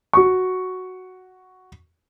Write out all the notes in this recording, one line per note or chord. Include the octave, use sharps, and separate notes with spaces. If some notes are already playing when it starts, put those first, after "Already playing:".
F#4 C#6